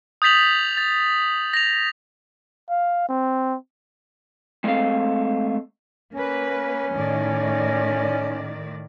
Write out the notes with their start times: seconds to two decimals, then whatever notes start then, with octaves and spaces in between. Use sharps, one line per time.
0.22 D#6 G6 A6 B6 F7 F#7
0.77 A6
1.54 A#6 F7
2.70 F5
3.09 C4
4.64 G#3 A3 C4 D#5 F5
6.14 A#3 C#4 B4
6.94 A2 D#3 D5